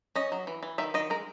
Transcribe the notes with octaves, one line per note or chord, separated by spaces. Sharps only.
C#4 D#5
F#3
E3
E3
D#3 E5
D#3 D#5
G#3 A#4